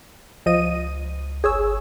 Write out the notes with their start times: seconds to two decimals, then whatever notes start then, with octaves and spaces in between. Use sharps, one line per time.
0.46 C#2 F3 D#5 D#7
1.44 G1 G#4 C#5 E6